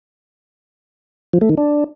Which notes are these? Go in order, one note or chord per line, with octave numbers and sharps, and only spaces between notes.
F3
A3
D#3
D4